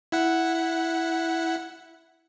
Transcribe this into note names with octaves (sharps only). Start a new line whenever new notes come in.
E4 F#5